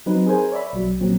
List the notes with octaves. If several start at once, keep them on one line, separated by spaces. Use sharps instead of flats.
F#3 C4 D#4 B4
G#4 A#4 C5 G#5
C#5 D5 E5 B5
B1 F#3
A#2 F#3 C4